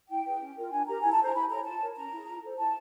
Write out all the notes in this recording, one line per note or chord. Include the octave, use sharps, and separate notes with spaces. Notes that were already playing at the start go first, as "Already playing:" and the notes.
E4 G5
G#4 B4
C#4
F4 A#4
D4 G#5
G4 A#4 A#5
E4 G#5
A5
A4 C5 A#5
E4 B5
A4 C#5 A#5
F4 A5
A#4 C#5
C#4 A#5
E4 G#4
F4
A4 C5
E4 A5